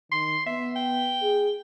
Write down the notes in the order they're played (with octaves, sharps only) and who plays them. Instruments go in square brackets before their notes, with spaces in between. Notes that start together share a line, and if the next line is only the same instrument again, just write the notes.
[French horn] D#3 [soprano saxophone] C6
[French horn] B3 [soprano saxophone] E5
[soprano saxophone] G5
[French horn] G#4